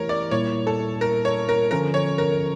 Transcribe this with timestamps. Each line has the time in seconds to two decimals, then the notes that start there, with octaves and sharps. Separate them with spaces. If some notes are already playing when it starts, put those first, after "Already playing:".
Already playing: E3 A3 E4 G4 A#4 C#5
0.09 D5
0.31 A#2 G3 A#3 E4 C#5
0.67 A4
1.01 A#4
1.25 C#5
1.49 A#4
1.71 D3 F3 C#4 F4 A4 A#4
1.94 C#5
2.18 A#4